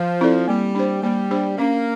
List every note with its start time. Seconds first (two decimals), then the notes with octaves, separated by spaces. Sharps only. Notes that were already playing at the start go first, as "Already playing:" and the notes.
Already playing: F3
0.21 C4 E4 A4 D5
0.48 G3 A#3
0.75 D4 G4 C5
1.03 G3 A#3
1.31 D4 G4 C5
1.58 A#3 C#4